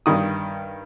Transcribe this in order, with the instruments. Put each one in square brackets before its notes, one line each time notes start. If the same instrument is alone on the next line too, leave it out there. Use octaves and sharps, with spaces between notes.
[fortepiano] G2 D#3 D#6